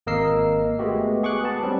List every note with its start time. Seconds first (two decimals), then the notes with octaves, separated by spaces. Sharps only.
0.07 G#1 A#3 A#4 D#5 E6 C7
0.79 G#3 A3 B3 F#4 G4
1.23 G#4 C#6 D6 F#6
1.44 B3 A5
1.63 G3 C4 C#4